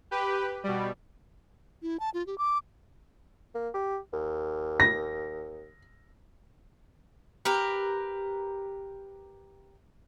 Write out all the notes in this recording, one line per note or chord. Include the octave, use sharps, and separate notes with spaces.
G4 B4
B2 G3
E4
A5
F4
G4
D6
A#3
G4
D#2
A#6
G4 A#4 B4